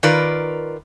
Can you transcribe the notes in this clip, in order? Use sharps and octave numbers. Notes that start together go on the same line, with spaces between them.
D#3 F4 A#4 B4 D5